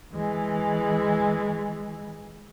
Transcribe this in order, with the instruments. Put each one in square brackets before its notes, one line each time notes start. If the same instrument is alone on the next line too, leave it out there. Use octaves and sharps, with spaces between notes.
[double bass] E3 G#3